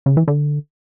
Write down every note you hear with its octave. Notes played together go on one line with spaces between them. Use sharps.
C#3
E3
D3